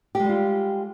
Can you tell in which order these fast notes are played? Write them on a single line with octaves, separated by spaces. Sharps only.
G4 G#3 G3 F4